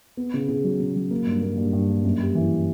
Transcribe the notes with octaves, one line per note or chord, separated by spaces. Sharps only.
B3
C#3
C#3
F#3
C#3
F#3
A#3
G2
A#3
G2
G2
A#3
F#2
G3
E3